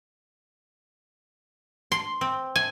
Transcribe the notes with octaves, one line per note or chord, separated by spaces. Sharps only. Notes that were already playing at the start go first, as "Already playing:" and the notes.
C6
C4
G#5